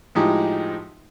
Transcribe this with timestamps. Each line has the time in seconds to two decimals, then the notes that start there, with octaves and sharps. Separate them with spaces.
0.15 A2 F3 G#3 D#4 G4